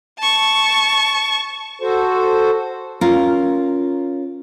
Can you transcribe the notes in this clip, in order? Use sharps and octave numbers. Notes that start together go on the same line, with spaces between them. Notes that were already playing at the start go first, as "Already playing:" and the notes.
A5 C#6
F#4 A4 C5
C#4 F4 A#4